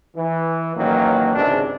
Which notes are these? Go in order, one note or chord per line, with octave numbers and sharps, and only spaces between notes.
E3
A1 D#3 F#3 A#3
G#1 C#2 G#2 C3 D4